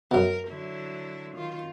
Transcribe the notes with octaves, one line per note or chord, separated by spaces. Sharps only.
F#2 B2 A#4
D3 F#3 E4
D#3 F4